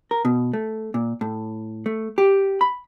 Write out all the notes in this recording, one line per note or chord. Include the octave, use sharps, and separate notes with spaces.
A#4
B2
A3
A#2
A2
A3
G4
B5